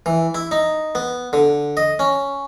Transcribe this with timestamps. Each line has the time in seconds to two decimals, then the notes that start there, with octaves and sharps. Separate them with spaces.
0.06 E3
0.35 E4
0.51 D#4
0.95 B3
1.33 D3
1.77 D#5
1.99 C#4